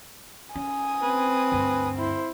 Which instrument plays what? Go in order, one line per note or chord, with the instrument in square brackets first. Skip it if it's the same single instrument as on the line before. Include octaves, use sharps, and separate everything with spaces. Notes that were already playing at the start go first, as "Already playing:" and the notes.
[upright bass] C#4 [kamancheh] G#5 D#6
[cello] C4 [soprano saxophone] B4
[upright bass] D2 G2
[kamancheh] E4 C5